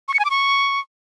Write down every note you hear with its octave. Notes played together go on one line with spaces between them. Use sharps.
C#6
C#7
G#5
D6
C#6